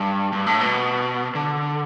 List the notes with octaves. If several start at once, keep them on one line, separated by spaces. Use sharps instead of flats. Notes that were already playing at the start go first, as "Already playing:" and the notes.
Already playing: G2
G2
A2
B2
D3